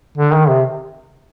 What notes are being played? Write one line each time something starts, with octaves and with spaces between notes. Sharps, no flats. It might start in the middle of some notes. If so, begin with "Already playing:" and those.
D3
D#3
C3